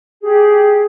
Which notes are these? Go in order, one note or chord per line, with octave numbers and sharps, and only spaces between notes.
G4 G#4